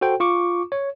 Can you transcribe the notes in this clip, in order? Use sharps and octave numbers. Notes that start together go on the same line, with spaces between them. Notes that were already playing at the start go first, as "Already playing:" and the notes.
F#4 A4 C5 G5
F4 C#6 D6
C#5